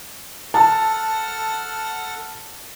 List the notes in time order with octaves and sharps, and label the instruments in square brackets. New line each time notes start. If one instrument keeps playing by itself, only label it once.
[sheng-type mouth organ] A4 F#5 F6 [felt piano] A5